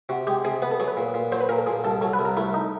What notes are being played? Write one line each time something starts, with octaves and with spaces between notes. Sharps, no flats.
C3 F#4
G#3 G4
C3 G#4
B3 B4
A4
F#3 G#4
B4
A#2
A#2
F#3 C5
B4
A#2 A#4
A4
A#2 G#4
C2 A4
F#3 A4
B4
C2
A#4
A3 E4
D#4